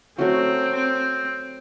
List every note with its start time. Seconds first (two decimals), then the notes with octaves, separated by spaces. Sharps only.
0.18 F#3 A3 C4 C#4 F#4
0.75 C4